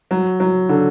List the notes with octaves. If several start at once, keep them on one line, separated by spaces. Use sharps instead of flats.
F#3
F#3
D3